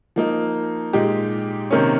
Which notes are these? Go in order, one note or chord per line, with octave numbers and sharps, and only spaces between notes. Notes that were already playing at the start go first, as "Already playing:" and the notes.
F3 A#3 D#4
A#2 G#3 D#4 G4
C3 D#3 A#3 C#4